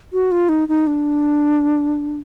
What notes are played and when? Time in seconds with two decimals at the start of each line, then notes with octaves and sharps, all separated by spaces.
0.13 F#4
0.31 F4
0.49 D#4
0.68 D#4
0.87 D4